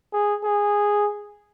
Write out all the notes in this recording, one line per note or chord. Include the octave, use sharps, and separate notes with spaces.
G#4
G#4